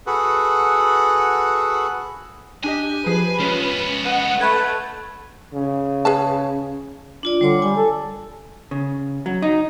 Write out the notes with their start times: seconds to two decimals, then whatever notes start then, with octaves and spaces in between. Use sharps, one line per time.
0.07 F#4 G#4 A4 B4 F#5
2.64 D4 G4 D#5 G#5
3.06 F3 G#4 B4
3.40 G#3 B3 C#4 F4 B6
4.06 B4 D#5 F#5
4.41 A3 B4 F#5 G#6
5.54 C#3
6.05 G#4 B4 A5
7.23 D4 F4 D5
7.41 D3 G3 C#5 D6
7.62 G3 G#5
7.77 A4
8.71 C#3
9.26 F#3
9.42 D#4